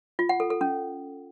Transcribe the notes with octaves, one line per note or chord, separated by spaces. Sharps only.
F4
F#5
A4
A4
C#4